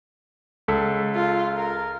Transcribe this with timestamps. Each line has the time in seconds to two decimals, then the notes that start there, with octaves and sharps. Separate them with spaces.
0.68 C#2 A4 B6
1.15 F4
1.57 A#4